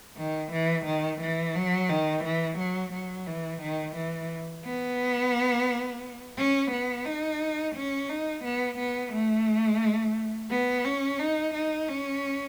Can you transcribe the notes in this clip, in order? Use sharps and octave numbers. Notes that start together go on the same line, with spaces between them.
D#3
E3
D#3
E3
F#3
D#3
E3
F#3
F#3
E3
D#3
E3
B3
C#4
B3
D#4
C#4
D#4
B3
B3
A3
B3
C#4
D#4
D#4
C#4